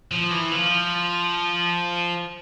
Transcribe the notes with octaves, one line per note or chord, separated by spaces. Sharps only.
F3
E3
F3